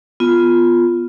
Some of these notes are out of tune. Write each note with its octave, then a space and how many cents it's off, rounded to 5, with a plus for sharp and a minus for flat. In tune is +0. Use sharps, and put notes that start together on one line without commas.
B3 +0 F4 +0